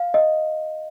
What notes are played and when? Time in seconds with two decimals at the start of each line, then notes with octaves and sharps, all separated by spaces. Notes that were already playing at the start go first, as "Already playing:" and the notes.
Already playing: F5
0.14 D#5